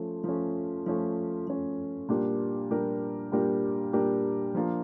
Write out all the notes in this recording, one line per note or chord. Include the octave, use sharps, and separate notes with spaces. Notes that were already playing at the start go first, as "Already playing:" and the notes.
Already playing: F3 A3 C#4
F3 A3 C#4
F3 A3 C#4
F3 A3 C#4
A#2 G3 D4 G4 A#4
A#2 G3 D4 G4 A#4
A#2 G3 D4 G4 A#4
A#2 G3 D4 G4 A#4
F3 A#3 D4 F4 A#4